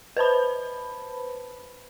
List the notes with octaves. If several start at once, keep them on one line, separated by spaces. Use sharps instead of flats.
B4 C5 A5 B5